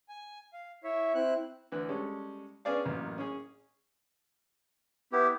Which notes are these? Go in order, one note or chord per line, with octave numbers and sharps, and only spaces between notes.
G#5
F5
E4 C#5 E5
C4 E4 F#6
D2 E3 F#6
G3 G#3 C#4 A4
B3 C#4 D4 G#4 D5 F5
A1 F#2 A#3
C#4 G#4
B3 E4 G4